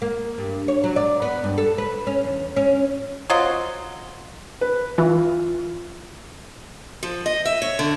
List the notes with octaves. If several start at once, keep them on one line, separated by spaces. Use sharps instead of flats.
A#3
G2
C#5
F#3
D5
B3
G2
A4
B4
C#4
E2
C#4
F#3 F4 C5 D#5
B4
E3 F4
F3
D#5
E5
C#5
D3